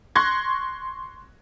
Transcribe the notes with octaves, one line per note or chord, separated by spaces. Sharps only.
C6 C#6 F#6 G#6 A#6